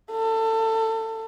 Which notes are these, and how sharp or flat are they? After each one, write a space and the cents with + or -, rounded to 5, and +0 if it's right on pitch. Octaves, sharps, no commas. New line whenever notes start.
A4 +25